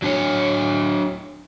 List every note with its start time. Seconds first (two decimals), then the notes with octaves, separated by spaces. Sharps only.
0.02 F#3 D4 C#5